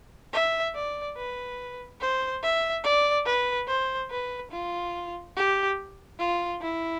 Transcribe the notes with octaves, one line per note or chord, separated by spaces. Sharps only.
E5
D5
B4
C5
E5
D5
B4
C5
B4
F4
G4
F4
E4